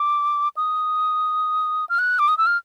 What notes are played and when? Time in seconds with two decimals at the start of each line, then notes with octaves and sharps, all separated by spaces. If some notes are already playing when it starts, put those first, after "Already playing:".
Already playing: D6
0.57 D#6
1.89 F6
1.99 F#6
2.19 D6
2.28 D#6
2.38 E6
2.46 F6